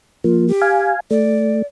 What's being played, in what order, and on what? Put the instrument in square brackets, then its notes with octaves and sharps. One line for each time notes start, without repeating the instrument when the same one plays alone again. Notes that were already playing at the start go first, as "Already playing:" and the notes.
[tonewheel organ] F3 A#3 [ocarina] F4
[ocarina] G4
[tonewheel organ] F5 G#5
[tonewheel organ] A3 [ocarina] D5